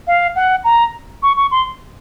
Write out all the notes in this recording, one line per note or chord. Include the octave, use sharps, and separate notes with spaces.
F5
F#5
A#5
C#6
C#6
C6